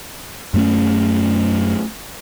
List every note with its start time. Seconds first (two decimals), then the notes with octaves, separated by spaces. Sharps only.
0.54 F#2 A3 C#4